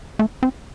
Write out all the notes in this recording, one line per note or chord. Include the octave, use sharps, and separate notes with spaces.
A3
C4